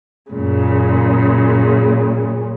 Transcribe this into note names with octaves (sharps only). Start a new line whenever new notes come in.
F#2 A#2 C#3